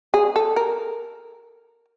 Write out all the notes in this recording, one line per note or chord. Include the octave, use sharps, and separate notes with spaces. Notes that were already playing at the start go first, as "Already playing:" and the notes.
G#4
A4
A#4